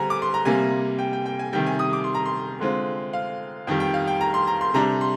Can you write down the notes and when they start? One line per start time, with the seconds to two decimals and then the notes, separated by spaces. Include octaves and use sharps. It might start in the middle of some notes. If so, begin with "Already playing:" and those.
Already playing: D3 G3 C4 G#5 A#5
0.10 D6
0.22 C6
0.34 A#5
0.45 C3 G3 A#3 G#5
0.99 G5
1.13 G5
1.26 G5
1.39 G#5
1.53 C3 D#3 G3 G5
1.66 G#5
1.79 D#6
1.93 D6
2.04 C6
2.15 A#5
2.25 C6
2.60 D3 G#3 C4 F4
3.13 F5
3.67 F2 D#3 G3 G5
3.80 G5
3.94 F5
4.07 G5
4.21 A#5
4.34 C6
4.47 A#5
4.61 C6
4.74 C3 G3 D4 A#5
5.01 C6